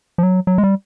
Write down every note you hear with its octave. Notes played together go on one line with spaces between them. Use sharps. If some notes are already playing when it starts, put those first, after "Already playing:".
F3
F#3
F#3
G#3
G3